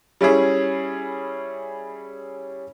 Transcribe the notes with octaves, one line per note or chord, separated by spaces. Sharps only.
G3 C#4 E4 G#4